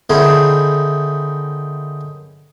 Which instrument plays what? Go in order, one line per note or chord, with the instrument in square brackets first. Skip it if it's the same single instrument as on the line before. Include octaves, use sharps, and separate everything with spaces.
[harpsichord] D3 D#3 C4 C#4 E4 G#4